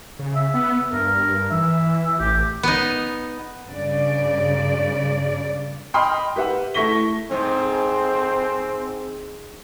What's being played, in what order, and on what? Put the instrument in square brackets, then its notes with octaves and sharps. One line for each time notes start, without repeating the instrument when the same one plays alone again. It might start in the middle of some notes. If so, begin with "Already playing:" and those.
[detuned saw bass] C#3
[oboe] E5
[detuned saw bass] B3
[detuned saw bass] G2 [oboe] A#4
[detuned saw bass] E3 [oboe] E5
[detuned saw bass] A1 [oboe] G4
[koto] B3 D#4
[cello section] G2 C#3 D5
[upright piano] D#5 G5 B5 C6 D#6 F6
G4 B4 E5 F#5
A3 E4 C#6 A#6 B6 G7
[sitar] G#2 [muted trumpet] C4